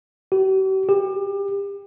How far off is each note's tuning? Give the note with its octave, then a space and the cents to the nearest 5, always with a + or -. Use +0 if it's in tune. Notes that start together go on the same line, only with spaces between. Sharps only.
G4 -45
G4 +30